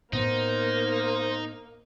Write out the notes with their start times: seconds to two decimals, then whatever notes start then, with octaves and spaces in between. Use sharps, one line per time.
0.13 A2 A#3 B3 D#4 C5